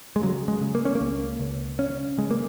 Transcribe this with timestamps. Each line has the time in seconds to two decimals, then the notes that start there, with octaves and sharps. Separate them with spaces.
0.16 G#3
0.22 C#3 F#3
0.48 G#3
0.61 C#3
0.75 A#3
0.85 C#4
0.95 A#3
1.01 C#2
1.40 C#2
1.79 C#3 C#4
2.18 C#3 G#3
2.31 A#3